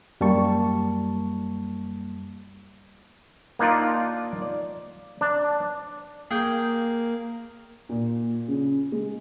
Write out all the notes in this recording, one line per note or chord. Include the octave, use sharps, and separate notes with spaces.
F#2 G3 A#3 A5 C#6
A#3 D4 D#4 F4 D5
D5
D4
A#3 G#4 G5
A#2
C#3
G#3